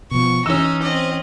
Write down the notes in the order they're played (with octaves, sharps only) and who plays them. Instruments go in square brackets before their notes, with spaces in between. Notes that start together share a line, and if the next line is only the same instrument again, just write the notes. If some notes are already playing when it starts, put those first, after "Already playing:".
[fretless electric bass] B2 F3 [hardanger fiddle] C#6
[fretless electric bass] E3 [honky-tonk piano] C#4 E6 [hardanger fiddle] D#4
[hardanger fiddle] C4 D#5